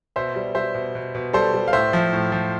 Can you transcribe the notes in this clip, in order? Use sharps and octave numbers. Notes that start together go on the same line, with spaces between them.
B2 C5 E5
G3
G3 C5 E5
B2
B2
B2
G3 A4 C5
G3
F5
A2 C5 E5
F3
A2
F3